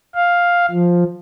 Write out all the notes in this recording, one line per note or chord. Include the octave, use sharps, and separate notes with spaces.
F5
F3